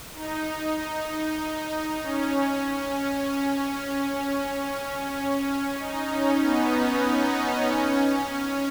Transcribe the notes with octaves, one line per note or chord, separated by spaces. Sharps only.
D#4
C#4
D#4
C#4
B3
B3
D#4
C#4